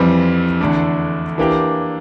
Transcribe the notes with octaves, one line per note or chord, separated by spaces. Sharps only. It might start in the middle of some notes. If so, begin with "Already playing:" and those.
Already playing: F2 E3 G3 C4
E2 D3 A3 D4
E3 A#3 D4 G4